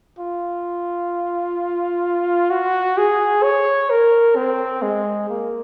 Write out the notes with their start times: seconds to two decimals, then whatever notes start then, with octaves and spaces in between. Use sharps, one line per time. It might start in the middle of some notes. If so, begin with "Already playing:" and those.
0.19 F4
2.50 F#4
2.98 G#4
3.43 C#5
3.90 A#4
4.36 C4
4.82 G#3
5.29 A#3